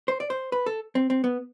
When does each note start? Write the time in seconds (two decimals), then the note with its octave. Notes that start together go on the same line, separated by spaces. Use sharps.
0.08 C5
0.20 D5
0.30 C5
0.52 B4
0.66 A4
0.95 C4
1.10 C4
1.24 B3